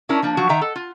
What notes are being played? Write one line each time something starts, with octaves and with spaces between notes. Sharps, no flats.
C#4 D4 E4 A#4
F3 A#3 D4
F3 F#3 F#4
D#3 E5 G5 A#5
A4
F4